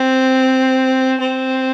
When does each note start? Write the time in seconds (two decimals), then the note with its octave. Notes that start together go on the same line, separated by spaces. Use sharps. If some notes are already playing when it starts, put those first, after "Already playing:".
Already playing: C4
1.20 C4